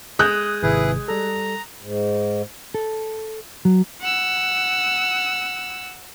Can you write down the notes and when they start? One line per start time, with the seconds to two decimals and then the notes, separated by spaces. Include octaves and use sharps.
0.19 G#3 D#6 F#6 G6
0.63 G#1 C3 E4 G#4 B4
1.08 G3 A4 A#5
1.80 G#2
2.74 A4
3.65 F#3
4.01 F#5 E6